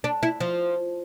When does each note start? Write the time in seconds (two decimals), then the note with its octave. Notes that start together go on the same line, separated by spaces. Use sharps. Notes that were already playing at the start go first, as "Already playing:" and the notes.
0.04 D4
0.23 E4
0.40 F3